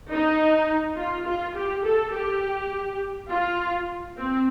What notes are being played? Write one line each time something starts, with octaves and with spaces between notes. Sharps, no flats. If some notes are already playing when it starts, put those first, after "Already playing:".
D#4
F4
F4
G4
A4
G4
F4
C4